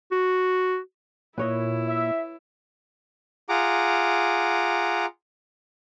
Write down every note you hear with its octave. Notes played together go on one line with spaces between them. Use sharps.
F#4
A#2 E4 B4 C#5 D#5
E5
F4 G#4 F#5 A#5 D6